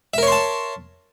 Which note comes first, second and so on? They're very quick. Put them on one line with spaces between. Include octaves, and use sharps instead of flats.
E5 A#4 C#5 C6 A5